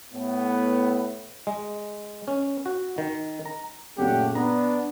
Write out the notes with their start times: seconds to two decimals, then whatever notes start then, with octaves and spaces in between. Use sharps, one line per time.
0.13 A2 B3
1.47 G#3
2.28 C#4
2.66 F#4
2.98 D#3
3.46 A#5
3.98 F#2 A#2 C#3 A3 G4 F#5
4.35 B3 D4 A#5